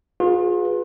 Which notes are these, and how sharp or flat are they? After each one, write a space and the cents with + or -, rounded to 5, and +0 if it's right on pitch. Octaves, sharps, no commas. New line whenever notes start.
F4 +35 G#4 +0 B4 +0